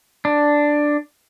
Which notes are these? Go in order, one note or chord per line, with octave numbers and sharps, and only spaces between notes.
D4